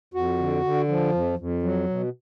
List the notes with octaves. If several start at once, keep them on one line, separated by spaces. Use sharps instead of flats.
F2 F#4
D3
D3
F3
F2
F2
F#3
B2